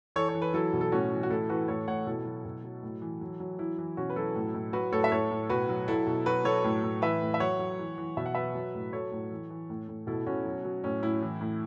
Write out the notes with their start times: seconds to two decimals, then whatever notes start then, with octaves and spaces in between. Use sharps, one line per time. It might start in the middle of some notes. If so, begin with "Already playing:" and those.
0.16 E3 A4 C#5
0.29 C#5
0.34 E3
0.42 B4
0.54 F#3 E4 A4
0.73 B2
0.81 A4
0.92 A2 C#4 F#4
1.12 E3
1.23 F#4
1.30 A2 E4 A4
1.49 E3 F#4 B4
1.68 A2 A4 C#5
1.87 A2 C#5 F#5
2.06 B2 E4 A4
2.25 F#3
2.45 B2
2.64 F#3
2.83 A2
3.02 E3
3.21 F#3
3.40 F#3
3.59 E3 E4
3.78 E3
3.97 B2 C#4 F#4
4.10 B4
4.16 F#3 E4 A4
4.35 A2
4.54 A2
4.73 F#3 F#4 B4
4.92 A2 A4 C#5
5.04 E5
5.11 A2 A4 C#5
5.31 A2
5.49 B2 F#4 B4
5.69 F#3
5.88 F#3 E4 A4
6.07 B2
6.26 F#3 F#4 B4
6.45 F#3 A4 C#5
6.64 A2
6.83 A2
7.02 E3 B4 E5
7.22 A2
7.34 E5
7.40 F#3 C#5 F#5
7.59 F#3
7.79 E3
7.98 E3
8.17 B2 E5
8.26 F#5
8.35 F#3 B4 E5
8.55 F#3
8.75 A2
8.93 F#3 A4 C#5
9.12 A2
9.31 E3
9.50 E3
9.70 A2
9.88 A2
10.07 B2 E4 A4
10.26 B2 C#4 F#4
10.45 F#3
10.65 F#3
10.84 A2 C#4
11.02 A2 E4
11.22 E3
11.41 A2